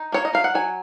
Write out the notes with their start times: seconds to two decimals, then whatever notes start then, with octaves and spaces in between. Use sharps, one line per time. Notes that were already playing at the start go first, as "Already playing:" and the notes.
Already playing: D#4
0.12 A#3 C#5
0.25 D#5
0.33 F#3 F5
0.44 F#5
0.55 F#3 G#5